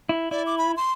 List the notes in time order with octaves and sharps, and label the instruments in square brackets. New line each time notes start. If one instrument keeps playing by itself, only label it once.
[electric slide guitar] E4
[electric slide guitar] E4 [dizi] D5
[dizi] D6
B5
C6